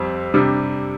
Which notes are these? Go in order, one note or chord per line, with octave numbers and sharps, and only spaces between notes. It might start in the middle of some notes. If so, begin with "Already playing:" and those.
Already playing: F2 G3 C4 G4
C3 G3 D4